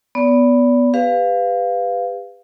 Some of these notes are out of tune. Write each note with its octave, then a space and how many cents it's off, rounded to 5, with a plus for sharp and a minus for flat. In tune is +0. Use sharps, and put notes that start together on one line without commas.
B3 +0 D5 -35
G4 +40 B4 +20 F5 -5